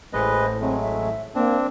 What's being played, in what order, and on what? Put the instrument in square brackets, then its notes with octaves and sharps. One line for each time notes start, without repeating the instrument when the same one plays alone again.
[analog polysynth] A1 A2 [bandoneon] G#3 B4 D#5 [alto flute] C5
[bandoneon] F#3 G#3 A3 [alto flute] C4
[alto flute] E5
[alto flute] A#3 [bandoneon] C4 D4